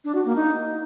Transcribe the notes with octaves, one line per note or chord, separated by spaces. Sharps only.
D4
F#4
A#3
D#4